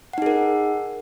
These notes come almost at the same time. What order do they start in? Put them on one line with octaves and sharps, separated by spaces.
F#5 D#4 G#4 A#4